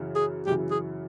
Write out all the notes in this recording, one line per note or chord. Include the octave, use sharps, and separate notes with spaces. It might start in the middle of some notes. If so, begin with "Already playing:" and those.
Already playing: F#2 C#3 E3
G#4
F#2 C#3 E3 G4
G#4